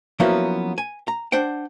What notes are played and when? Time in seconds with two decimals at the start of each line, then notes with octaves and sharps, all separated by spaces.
0.20 F3 F#3 A#3 B3 C#4 E4
0.78 G#5
1.08 A#5
1.32 D4 C5 F#5 G5